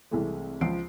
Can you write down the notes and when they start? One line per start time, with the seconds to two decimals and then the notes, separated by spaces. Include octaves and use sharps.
0.11 C2 C3 E3 G#3 A3
0.61 C#2 F3 C7 D7